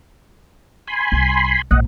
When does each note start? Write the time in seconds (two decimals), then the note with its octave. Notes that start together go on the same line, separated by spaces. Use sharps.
0.87 G#5 B5 C6
1.12 C2 C3
1.71 A#1 G#2 D#5 F#5